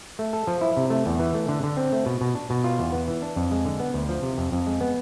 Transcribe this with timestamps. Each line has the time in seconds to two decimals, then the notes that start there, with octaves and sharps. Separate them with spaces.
0.19 A3
0.33 A4
0.47 F3
0.61 E4
0.77 C3
0.90 A3
1.06 E2
1.19 E3
1.34 A3
1.48 D3
1.63 D3
1.77 C4
1.93 A3
2.06 B2
2.21 B2
2.35 D4
2.50 B2
2.64 F4
2.79 E2
2.92 B3
3.08 E3
3.22 D4
3.36 F2
3.51 G#3
3.65 D3
3.80 B3
3.94 D2
4.09 F3
4.22 C3
4.38 F2
4.52 F2
4.66 G#3
4.81 B3